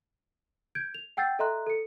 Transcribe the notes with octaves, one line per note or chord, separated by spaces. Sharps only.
G6 G#6 D7
F7
F#5 G5 E6 G6 A6 C7
A4 D#5 E5 A#5 C6 F#6
A4 C#7